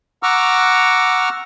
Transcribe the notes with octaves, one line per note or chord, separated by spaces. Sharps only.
F#5 A#5 C#6 D6 E6 F6